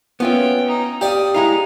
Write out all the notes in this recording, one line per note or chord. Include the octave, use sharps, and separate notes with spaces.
B3 C#4 F4 E5 G5
D#4
G4 D5 F5 D#6
G#3 D#4 E4 F5